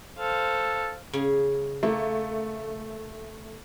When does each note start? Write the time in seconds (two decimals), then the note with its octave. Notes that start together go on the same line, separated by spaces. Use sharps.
0.18 A4 C5 F5
1.13 C#3 G#4
1.83 A3 A#3